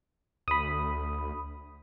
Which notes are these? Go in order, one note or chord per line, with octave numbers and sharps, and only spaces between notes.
D2 B5 D#6